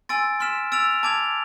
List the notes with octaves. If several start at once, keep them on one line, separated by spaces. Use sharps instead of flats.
G#5 C6 E6 A6 D7
C6 F6 B6 E7
E6 A6 D7 F7
A5 D6 G#6 D7 F7